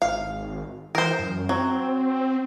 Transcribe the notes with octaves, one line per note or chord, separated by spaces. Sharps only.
G#1 F5
E3 A#4 C5
F#2
F#3 C4